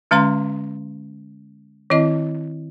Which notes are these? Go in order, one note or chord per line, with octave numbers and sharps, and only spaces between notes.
D3 G#3 C#4 F5 A#5 C6
D#3 C4 E4 D#5